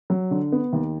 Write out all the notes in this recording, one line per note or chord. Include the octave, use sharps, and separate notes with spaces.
F#3
D3
B3
D#2